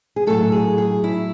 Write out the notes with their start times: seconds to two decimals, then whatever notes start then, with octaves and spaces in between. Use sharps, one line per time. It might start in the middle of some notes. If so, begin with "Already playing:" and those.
0.16 G#4
0.27 A2 F#3 A4
0.52 G#4
0.78 G#4
1.04 E4